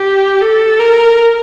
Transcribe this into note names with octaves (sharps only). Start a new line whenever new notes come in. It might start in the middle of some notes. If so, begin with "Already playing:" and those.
Already playing: G4
A4
A#4